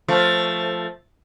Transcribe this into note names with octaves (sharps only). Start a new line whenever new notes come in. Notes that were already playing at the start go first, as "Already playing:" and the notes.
F3 A3